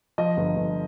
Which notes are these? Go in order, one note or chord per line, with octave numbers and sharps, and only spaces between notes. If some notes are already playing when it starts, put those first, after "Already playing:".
F3 D#5
G1
G1